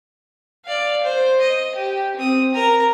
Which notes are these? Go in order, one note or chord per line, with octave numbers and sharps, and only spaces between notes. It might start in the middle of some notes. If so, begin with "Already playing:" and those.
D5 F5
C5
D#5
G4
C4 D#6
A#4 A#5